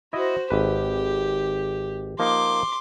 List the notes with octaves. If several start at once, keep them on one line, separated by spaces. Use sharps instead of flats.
E4 F#4 C5 D#5
G#1 G4 B4
F3 A#3 D#4 C6 D6